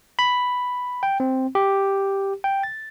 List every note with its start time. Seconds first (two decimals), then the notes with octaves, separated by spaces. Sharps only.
0.19 B5
1.03 G5
1.20 C4
1.55 G4
2.44 G5
2.63 A6